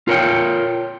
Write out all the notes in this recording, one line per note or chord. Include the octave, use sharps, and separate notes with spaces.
F4 A#4 C#5 G5